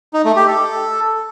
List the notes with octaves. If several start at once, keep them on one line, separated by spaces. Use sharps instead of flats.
D#4
A3
G4
A4